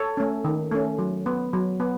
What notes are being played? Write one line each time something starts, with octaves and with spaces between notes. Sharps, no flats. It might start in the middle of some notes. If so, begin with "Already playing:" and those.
Already playing: A4 C#5
A3 C#4
D#3
A3 C#4
F#3
B3
F#3
B3